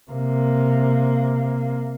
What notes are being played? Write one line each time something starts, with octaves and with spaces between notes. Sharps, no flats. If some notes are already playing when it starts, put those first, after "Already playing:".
C3 A#3